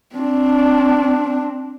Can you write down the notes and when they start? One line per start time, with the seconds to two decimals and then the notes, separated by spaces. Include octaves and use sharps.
0.15 C4 D4